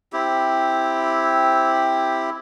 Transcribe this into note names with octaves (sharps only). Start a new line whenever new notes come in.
C4 E4 G4